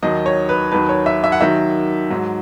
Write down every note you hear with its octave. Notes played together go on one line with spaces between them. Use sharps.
D#2 D#3 F#3 D#5
C#5
B4
D#2 D#3 F#3 B4
C#5
E5
E5
F#5
D#2 D#3 F#3 E5
G#2 F#3